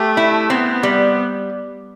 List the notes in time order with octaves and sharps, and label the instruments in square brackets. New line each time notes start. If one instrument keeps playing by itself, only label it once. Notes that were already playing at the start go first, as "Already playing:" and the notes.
Already playing: [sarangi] A3 [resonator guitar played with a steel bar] G4
[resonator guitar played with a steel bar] E4
[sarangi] B3 [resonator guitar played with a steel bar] C4
[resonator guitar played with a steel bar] G3